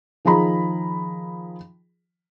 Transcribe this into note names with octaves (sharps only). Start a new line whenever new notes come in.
D#3 F3 G#4 A#5 B5